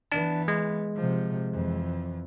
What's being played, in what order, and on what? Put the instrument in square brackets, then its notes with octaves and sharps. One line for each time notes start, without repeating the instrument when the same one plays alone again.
[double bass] E3 B3 [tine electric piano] D4 A5
[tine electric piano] G#3
[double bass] C3 F3
F2 E3